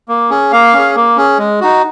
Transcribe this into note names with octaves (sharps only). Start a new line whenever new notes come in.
A#3
C#4 G#4
A#3 F5
C#4 G#4
A#3
C#4 G#4
G#3
D#4 F#4